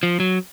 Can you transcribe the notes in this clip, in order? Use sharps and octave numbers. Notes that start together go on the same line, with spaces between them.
F3
F#3